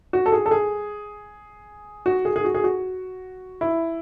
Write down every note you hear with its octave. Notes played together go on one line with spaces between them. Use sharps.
F#4
A4
G#4
A4
G#4
F#4
G#4
G#4
F#4
G#4
F#4
E4